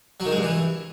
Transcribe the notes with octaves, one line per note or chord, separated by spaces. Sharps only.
F#3
D#3
G#3
G2
E3